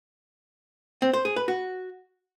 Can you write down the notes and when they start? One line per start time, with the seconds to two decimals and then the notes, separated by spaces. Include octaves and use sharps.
1.02 C4
1.13 C5
1.25 G#4
1.36 B4
1.48 F#4